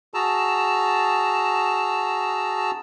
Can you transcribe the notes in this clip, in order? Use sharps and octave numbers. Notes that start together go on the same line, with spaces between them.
F#4 G#4 A5 A#5 E6